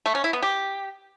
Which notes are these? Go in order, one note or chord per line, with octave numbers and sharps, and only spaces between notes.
A3
C#4
E4
B3
G4